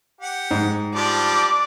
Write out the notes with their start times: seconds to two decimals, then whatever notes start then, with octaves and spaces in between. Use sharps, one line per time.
0.21 G4 F#5
0.51 G#2
0.95 F3 G3 D4 D5